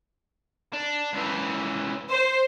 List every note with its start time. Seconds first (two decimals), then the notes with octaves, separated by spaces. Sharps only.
0.73 D4
1.13 C#2 E3
2.11 C5